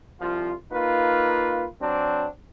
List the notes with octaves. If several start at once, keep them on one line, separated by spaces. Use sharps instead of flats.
C2 F3 F4
A#3 D#4 F4 B4
F#3 C4 D4